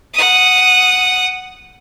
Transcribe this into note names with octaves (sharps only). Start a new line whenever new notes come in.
F#5 D#6